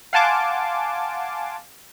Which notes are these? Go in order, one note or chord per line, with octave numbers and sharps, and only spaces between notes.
F5 F#5 G#5 A5 C6 D6